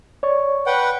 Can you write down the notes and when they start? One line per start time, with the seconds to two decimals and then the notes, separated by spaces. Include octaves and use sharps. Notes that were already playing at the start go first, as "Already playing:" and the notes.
0.23 C#5 D5 C#6
0.66 B4 F#5 G5